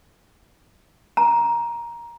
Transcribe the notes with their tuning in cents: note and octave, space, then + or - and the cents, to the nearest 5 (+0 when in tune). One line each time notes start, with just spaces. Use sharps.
A#5 +15